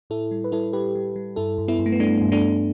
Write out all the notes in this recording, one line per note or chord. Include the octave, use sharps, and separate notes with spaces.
A2 E4 A4
G3
B4
G3 E4 A4
G3 G4 B4
G3
G3
G2 E4 A4
G2
B3 E4
G2
A3
B3
G3 A3 D4
G2
A3 D4
G2